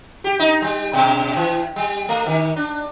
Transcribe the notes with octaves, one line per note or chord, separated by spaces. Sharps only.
G4
D#4
G3
B2
E3
G3
A3
D#3
D4